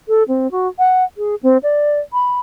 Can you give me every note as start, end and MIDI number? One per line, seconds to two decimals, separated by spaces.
0.08 0.23 69
0.28 0.50 60
0.51 0.68 66
0.79 1.04 78
1.17 1.35 68
1.43 1.58 60
1.63 1.99 74
2.13 2.40 83